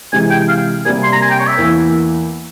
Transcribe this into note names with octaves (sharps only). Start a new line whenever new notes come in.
C3 E3 G#3 G#5
G5
F5
C3 G3 A#3 G#5
C6
A#5
G#5
G5
C#5
E5
E2 E3 A#3